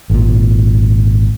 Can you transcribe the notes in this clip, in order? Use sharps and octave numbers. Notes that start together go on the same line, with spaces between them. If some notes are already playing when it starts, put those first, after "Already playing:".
G#1 A#2